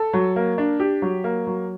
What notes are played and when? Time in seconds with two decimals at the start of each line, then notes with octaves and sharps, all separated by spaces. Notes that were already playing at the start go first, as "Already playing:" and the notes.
Already playing: A4
0.13 F#3
0.36 A#3
0.58 D4
0.80 G4
1.02 F#3
1.24 A#3
1.47 F#3